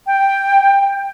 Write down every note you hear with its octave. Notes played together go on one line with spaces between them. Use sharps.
G5